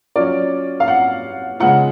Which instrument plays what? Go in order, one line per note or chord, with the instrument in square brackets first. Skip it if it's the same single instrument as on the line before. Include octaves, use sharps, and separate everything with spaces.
[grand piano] F#3 C#4 F4 [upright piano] D5
[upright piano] F5
F#5
[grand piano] C#3 G#3 B3 F4 [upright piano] F#5